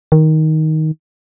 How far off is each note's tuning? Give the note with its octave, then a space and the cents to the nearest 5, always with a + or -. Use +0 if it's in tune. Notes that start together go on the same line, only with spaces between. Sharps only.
D#3 +10